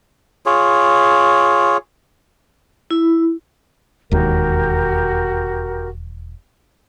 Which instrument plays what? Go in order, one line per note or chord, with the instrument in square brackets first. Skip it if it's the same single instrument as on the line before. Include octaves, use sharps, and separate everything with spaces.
[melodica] F4 G#4 C#5
[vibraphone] E4
[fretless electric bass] E1 D#2 [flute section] F#4 G4 A#4